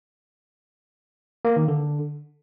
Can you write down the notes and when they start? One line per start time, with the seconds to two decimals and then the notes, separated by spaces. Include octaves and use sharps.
1.45 A#3
1.56 D#3
1.68 D3